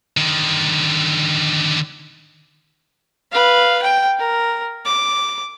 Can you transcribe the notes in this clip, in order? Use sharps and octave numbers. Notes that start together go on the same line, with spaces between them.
D3 D#3
B4 F5
G5
A#4
D6